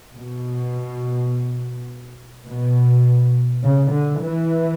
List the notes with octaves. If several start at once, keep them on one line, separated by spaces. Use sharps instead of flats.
B2
B2
C#3
D3
E3